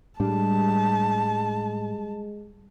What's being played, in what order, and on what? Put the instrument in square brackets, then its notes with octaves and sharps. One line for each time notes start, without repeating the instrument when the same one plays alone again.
[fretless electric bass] A2 D4 [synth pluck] G3 [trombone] G#3 [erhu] A5